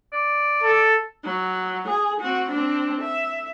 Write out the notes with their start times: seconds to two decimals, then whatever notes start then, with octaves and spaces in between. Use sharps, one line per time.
0.13 D5
0.63 A4
1.25 F#3
1.88 G#4
2.21 C4 F#4
2.51 C4 D4
3.02 E5